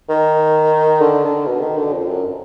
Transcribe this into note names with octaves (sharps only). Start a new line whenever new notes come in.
D#3
D3
D3
B2
D#3
D3
F2
F#2